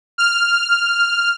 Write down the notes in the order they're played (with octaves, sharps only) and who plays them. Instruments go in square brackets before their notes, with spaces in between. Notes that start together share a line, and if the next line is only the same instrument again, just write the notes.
[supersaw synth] F6